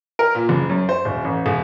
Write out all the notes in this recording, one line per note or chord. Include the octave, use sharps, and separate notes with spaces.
A#4
A#2
F#1
F#2
C5
D#1
A1
E1